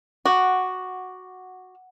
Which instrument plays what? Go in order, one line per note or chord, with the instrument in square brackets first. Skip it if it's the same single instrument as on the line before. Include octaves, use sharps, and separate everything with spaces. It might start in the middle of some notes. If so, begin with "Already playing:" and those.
[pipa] F#4 [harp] F#5 D6